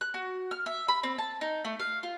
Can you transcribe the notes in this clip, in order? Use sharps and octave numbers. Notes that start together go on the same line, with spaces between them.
F#6
F#4
F6
E5
B5
C4
A5
D#4
A3
F5
F4